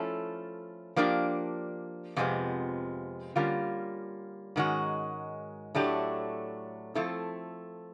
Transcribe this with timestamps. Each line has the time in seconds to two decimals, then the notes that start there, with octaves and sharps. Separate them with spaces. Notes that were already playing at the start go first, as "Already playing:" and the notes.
Already playing: F3 A3 C#4 E4 A4
0.96 F3 A#3 D4 G4
2.16 F2 C3 F3 G#3 B3
3.36 D3 G3 A#3 C#4 F4
4.56 G#2 D#3 G#3 C#4 F#4
5.75 A2 F#3 A3 D4 G4
6.95 F3 A3 C4 E4 A4